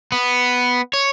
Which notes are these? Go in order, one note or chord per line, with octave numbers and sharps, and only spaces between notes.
B3
C#5